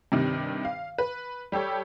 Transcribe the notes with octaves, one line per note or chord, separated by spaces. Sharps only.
G2 C3 D#3
F5
B4
G3 G4 A4 C#5